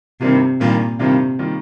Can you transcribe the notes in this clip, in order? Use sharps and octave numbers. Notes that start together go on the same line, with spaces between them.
G2 C3 D#3 G3 A#3 F4
G2 A#2 D#3 G3 A#3 F4
G2 C3 D#3 G3 A#3 F4
D#3 G3 A#3 F4